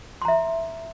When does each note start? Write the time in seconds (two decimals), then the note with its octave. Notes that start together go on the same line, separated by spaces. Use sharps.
0.22 C6
0.25 A#5
0.28 E5